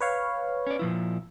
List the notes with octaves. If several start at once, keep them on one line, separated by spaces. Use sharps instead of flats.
B4 C#5 F5
C#4 D5
A#2 F3 E4